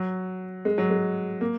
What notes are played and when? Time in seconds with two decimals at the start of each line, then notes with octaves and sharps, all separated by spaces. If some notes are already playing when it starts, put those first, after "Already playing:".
Already playing: F#3
0.65 G#3
0.78 F#3
0.91 G#3
1.41 A#3